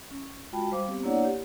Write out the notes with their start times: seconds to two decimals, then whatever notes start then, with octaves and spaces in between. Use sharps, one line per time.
0.11 C#4
0.53 G#3 F4 F#4 G5 A5 B5
0.71 G3 C5 F5 D6
0.88 B3 C4 G4
1.03 A#3 D4 E4 C#5 D5 F#5
1.25 G4